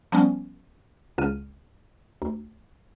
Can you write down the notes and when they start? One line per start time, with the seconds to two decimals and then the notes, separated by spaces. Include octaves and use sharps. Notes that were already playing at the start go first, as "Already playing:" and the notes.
0.12 F3 G3 B3 C#4
1.18 C#2 C#3 F6 D#7
2.22 D2